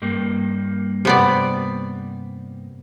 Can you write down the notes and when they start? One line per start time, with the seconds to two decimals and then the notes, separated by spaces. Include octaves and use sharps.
0.02 G2 G3 A#3
1.05 C3 B3 D5